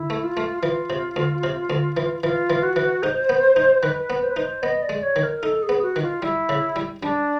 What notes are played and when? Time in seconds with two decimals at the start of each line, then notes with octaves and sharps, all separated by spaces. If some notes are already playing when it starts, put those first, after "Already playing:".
Already playing: D2 E4
0.10 A3
0.24 F4
0.37 A3
0.63 E3 F4
0.90 C3
1.16 D2
1.44 C3
1.70 D2
1.97 E3
2.23 E3 F4
2.50 E3
2.63 F#4
2.76 E3
3.03 D#4 C5
3.29 B3
3.56 D#4
3.83 D#3 B4
4.10 B3
4.23 C5
4.30 B4
4.36 D#4 C5
4.63 B3 D#5
4.83 D5
4.89 G#3
5.03 C#5
5.16 D#3
5.23 A#4
5.43 D#4 A4
5.63 G#4
5.69 B3
5.82 F#4
5.96 D#3
6.02 F4
6.22 G3 E4
6.49 C#3
6.76 G3
7.02 G3 D4